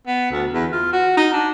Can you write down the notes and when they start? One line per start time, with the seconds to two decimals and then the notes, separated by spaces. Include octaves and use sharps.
0.07 B3
0.31 D2
0.53 E2
0.72 F4
0.93 F#4
1.17 D#4
1.33 D4